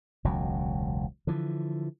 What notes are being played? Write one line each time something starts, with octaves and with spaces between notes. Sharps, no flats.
E1 C#2 F#3
D3 E3 F3